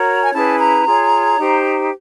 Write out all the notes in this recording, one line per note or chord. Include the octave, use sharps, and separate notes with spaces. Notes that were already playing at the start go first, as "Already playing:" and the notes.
Already playing: F#4 A#4 C#5 A#5
G#5
C#4 E4 G#4 B4 A5
A#5
F4 G#4 C#5
D#4 G4 C5